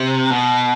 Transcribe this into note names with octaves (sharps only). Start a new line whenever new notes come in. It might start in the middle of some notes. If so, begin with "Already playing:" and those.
Already playing: C3
B2